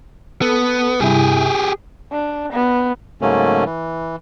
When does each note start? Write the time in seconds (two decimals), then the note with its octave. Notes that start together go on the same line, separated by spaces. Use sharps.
0.42 B3 A4
1.00 G2 C3 E4 G4 G#4
2.12 D4
2.52 B3
3.21 G#2 C#3 F#3 A3 A#3 C#4
3.65 E3